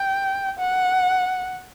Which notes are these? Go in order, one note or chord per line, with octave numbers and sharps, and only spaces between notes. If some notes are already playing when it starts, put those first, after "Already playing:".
Already playing: G5
F#5